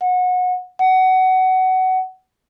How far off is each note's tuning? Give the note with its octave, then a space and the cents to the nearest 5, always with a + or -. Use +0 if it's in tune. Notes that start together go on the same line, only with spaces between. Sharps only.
F#5 -25
F#5 +20